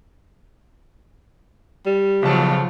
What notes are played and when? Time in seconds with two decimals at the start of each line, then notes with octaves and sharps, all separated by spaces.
1.86 G3
2.23 B1 C#3 F3 F#3 F4 A5